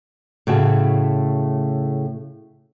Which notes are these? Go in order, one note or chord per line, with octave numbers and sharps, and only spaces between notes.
A2 C#3 A3 F#4